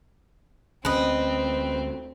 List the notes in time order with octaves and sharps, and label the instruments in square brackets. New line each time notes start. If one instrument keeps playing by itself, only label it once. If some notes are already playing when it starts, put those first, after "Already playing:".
[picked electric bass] D2 C#4 [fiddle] C4 [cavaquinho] B4 D#5